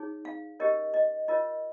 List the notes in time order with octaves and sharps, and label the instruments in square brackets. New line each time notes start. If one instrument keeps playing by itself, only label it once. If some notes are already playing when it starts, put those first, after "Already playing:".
Already playing: [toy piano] D#4 G#4 C#5
F5
C#4 G4 A#4 C#5 D#5
D#5
F4 A#4 C#5 D#5